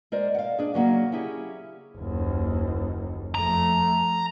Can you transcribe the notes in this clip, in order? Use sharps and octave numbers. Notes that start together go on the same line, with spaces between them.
G#3 A#4 C5 D5
F5 F#5
D4 G#4
C#3 F#3 A#3 C#4
C#4 E4 G4 G#4
F#1 D#2
F2 A3 A#5